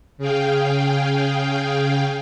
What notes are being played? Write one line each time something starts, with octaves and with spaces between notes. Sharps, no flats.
C#3 G#4 F5 G5